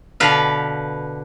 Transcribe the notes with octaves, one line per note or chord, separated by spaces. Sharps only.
B2 D3 B4 F5